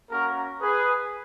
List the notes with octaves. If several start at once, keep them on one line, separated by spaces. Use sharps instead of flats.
A#3 C#4 F#4 A#4
G#4 B4